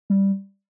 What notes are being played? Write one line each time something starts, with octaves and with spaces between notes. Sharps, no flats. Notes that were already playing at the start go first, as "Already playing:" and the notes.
G3